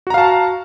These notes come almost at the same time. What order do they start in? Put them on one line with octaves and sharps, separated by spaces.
F#4 A#5 F5 A5